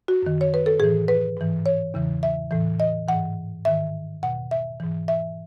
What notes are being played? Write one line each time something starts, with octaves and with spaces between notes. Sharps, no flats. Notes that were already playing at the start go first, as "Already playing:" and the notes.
F#4
F#2 D#3
C#5
B4
A4
A2 E3 G#4
B4
G#2 E3
C#5
E2 C#3 E3
E5
A2 E3
D#5
G#2 E3 F#5
G#2 D#3 E5
E2 B2 F#5
E5
G#2 E3
E5